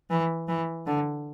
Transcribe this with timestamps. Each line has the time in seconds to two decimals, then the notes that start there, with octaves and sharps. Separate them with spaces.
0.10 E3
0.48 E3
0.86 D3